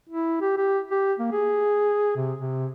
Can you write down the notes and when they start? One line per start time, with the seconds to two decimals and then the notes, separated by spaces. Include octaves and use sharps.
0.09 E4
0.41 G4
0.58 G4
0.91 G4
1.19 A#3
1.32 G#4
2.16 C3
2.38 C3